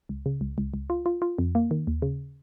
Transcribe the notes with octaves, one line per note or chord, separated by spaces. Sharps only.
C#2
C#3
C#2
C#2
C#2
F4
F4
F4
F2
A#3
D#3
D#2
C#3